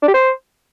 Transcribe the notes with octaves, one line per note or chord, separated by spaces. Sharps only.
D4
G4
C5